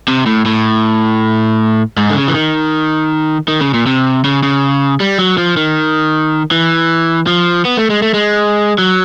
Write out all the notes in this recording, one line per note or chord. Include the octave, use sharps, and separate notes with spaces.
C3
A2
A2
G#2
D3
C#3
E3
D#3
D#3
C#3
A#2
C3
C#3
C#3
G3
F#3
F3
D#3
E3
F3
B3
A3
G#3
A3
G#3
F#3